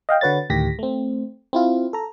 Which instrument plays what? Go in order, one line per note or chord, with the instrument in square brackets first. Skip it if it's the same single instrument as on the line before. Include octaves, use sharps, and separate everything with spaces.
[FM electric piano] D#5 F5 G5
D3 F#4 B4 C#5 A6
D2 A2 D#3 G4 A#6 B6
A3 C4
C4 E4 F4
A4 A#5